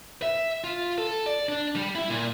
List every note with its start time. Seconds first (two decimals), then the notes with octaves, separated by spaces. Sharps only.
0.22 E5
0.64 F4
0.98 A4
1.26 D5
1.49 D4
1.76 G3
1.95 E4
2.10 A#2